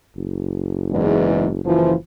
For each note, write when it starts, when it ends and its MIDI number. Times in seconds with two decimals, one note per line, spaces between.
0.17 1.63 30
0.90 1.48 40
0.90 1.48 44
0.90 1.48 52
1.65 1.95 30
1.65 1.93 52
1.65 1.93 53